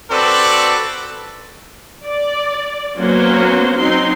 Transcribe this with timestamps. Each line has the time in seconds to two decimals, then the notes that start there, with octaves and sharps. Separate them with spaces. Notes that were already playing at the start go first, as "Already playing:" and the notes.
0.10 C4 F#4 A4 B4 D5
2.05 D5
2.98 F#3 A#3 B3 C#4 F#4 C5
3.78 F#3 C4 D#4 C6